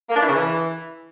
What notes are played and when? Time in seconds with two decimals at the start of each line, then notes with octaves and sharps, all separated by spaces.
0.09 A#3
0.16 D4
0.22 E3
0.28 C#3
0.34 E3